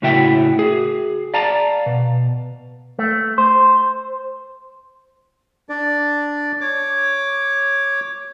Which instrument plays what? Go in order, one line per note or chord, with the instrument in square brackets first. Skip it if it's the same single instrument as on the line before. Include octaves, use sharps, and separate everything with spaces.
[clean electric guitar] A2 C#3 E4 F#4 E5 G5
F#4 G#4
D5 F5 A5 A#5
B2
A3
C5
[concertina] D4 D5
C#5 D6